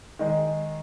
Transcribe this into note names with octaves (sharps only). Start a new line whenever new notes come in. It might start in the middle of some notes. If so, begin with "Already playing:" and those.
D#3 G#3 D#4